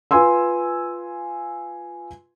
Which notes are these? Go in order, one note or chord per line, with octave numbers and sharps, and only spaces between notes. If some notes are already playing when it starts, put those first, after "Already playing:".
F4 B4 F5 G#5 C6 E6